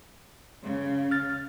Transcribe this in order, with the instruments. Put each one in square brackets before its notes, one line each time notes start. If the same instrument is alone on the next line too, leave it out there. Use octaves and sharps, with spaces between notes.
[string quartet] C#3
[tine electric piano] F6 A6